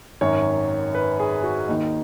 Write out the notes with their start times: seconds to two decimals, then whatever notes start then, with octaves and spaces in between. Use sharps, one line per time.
0.21 G#1 F#2 D#3 C#5
0.95 B4
1.20 G#4
1.44 F#4
1.68 D#2 D#3 D#4